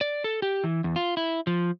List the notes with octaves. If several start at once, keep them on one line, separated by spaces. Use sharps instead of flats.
D5
A4
G4
E3
E2
F4
E4
F3